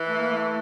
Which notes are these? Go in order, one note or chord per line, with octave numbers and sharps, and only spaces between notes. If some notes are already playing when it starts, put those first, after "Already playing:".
Already playing: E3
A3
A#3
A3